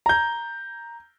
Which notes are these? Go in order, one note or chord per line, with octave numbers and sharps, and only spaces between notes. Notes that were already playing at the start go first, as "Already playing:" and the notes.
A#5 G6